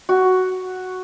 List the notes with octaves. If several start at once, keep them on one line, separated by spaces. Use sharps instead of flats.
F#4